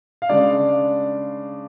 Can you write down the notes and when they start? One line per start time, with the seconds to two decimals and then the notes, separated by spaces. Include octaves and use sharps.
0.22 F5
0.29 C#3 G#3 D4 D5